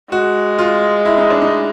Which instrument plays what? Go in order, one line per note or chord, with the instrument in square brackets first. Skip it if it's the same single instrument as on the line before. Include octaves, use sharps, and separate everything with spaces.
[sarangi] G#3 [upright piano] F#4
[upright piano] F4
E4
D#4
D4
D#4